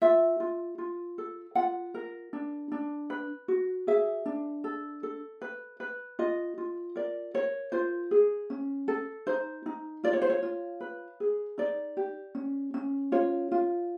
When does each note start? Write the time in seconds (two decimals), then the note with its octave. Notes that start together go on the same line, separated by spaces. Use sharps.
0.02 F4 E5
0.40 F4
0.78 F4
1.18 A4
1.55 F4 F#5
1.94 A#4
2.33 D4
2.72 D4
3.10 B4
3.48 F#4
3.87 G#4 E5
4.26 D4
4.64 A4
5.03 A4
5.42 B4
5.80 B4
6.19 F4 D#5
6.58 F4
6.96 A#4 D5
7.34 A#4 C#5
7.72 F4 C5
8.11 G#4
8.50 C#4
8.88 A4
9.27 D#4 C5
9.66 D#4
10.04 F4 D5
10.13 C#5
10.22 C5
10.30 C#5
10.42 F4
10.81 B4
11.20 G#4
11.58 D#4 D5
11.97 G4
12.35 C#4
12.74 C#4
13.12 F4 C#5
13.52 F4